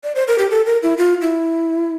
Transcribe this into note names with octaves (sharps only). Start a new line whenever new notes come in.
D5
C5
A#4
G4
A4
A#4
E4
F4
E4